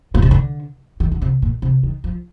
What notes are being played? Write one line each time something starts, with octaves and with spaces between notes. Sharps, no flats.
A#2
C3
D3
D#3
D3
C3
A#2
C3
D#3
F3